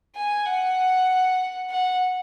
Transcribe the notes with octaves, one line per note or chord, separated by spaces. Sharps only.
G#5
F#5
F#5